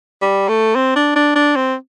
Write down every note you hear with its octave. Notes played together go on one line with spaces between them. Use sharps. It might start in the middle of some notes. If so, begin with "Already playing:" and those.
G3
A3
C4
D4
D4
D4
C4